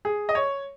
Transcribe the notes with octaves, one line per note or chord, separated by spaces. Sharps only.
G#4
D#5
C#5